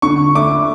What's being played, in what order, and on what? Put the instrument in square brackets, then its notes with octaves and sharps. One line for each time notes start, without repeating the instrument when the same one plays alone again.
[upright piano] D3 [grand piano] C#6
[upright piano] A3 D4 [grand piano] D6